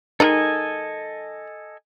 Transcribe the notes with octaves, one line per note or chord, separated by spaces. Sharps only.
D#3 G#3 D#4 A4 D#5 G#5